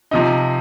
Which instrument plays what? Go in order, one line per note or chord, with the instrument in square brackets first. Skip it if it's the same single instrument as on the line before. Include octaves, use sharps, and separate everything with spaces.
[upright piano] C3 F3 D#4